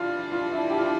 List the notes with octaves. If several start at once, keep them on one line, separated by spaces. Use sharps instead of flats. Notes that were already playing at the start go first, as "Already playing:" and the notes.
Already playing: E3 G3 D4 F4
F4
E4
G4
F4
E4